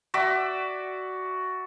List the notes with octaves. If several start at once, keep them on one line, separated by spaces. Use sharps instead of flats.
F#4 D5 E5